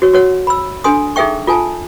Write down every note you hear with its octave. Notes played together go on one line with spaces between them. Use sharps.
F#4 C#5
F#4 C#5 F#5
B5 E6
D4 A4 G#5 C6 D#6
D#4 G#4 A4 E5 G5 C#6
F4 A4 G#5 A5